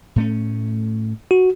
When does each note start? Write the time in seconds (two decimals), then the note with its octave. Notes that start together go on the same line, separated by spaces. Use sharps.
0.16 A2 A3 C#4
1.31 F#4